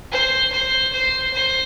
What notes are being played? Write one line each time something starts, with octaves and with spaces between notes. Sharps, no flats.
C5
C5
C5
C5